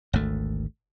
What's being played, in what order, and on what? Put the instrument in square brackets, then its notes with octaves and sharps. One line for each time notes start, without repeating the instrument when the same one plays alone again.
[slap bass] G#1 D2 A3